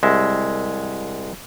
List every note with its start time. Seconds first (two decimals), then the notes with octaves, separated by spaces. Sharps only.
0.03 C2 G#3 E5